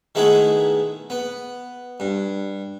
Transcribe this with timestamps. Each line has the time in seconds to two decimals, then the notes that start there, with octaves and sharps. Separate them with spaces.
0.15 D#3 G#3 A3 B3 E4 G#4
1.10 B3
2.00 G2